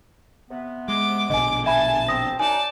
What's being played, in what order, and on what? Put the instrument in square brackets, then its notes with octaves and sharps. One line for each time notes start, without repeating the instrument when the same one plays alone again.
[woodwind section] C3 B3
[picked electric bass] G#3 [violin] D6
[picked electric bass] A#1 B2 D3 [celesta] D#5 G#5 [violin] D6
[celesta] E5 B5 [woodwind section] G#5 [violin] A5
[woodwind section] C4 [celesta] D#6 A#6
[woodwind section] F#2 D#4 [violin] D5 A5 [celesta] G#5